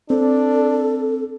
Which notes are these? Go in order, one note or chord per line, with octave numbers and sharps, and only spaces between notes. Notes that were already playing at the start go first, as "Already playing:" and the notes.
C4 D4 A4